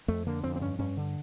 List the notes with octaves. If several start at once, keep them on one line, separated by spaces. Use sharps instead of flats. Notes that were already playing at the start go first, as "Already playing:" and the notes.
F2 A3
D3 A#3
F2 C4
C4
G2 C#4
G2 C#4
D3